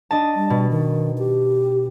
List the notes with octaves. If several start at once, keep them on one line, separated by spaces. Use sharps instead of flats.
D4 D#5 A5
G3
B2
D#3
G4